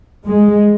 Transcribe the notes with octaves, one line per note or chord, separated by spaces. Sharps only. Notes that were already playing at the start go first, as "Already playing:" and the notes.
G#3